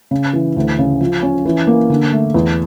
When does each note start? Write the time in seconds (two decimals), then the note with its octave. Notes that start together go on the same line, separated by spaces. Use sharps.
0.11 C#3
0.33 E3
0.56 D2
0.79 C#3
1.01 F3
1.23 C#4
1.45 E3
1.67 A#3
1.90 D3
2.12 A3
2.34 E2